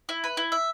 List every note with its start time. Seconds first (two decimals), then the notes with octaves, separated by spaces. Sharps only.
0.09 E4
0.24 B4
0.37 E4
0.52 E5